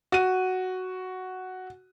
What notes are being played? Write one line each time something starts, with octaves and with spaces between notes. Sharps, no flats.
F#4 D#7